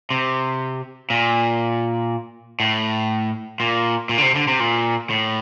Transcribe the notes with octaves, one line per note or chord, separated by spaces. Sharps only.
C3
A#2
A2
A#2
A#2
D3
C3
D3
C3
A#2
A2